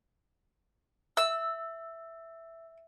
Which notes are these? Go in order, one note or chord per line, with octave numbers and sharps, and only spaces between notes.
E5 E6